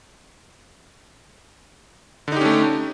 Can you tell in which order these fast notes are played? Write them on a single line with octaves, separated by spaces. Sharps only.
D3 D#4 G4 C#4 A3